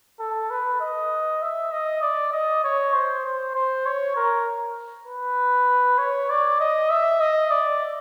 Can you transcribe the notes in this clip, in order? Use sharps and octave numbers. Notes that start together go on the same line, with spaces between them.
A4
B4
D#5
E5
D#5
D5
D#5
C#5
C5
C5
C5
C#5
A#4
B4
C#5
D5
D#5
E5
D#5
D5